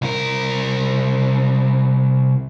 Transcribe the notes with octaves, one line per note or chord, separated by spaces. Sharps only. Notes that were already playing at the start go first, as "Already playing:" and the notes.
C2 A#4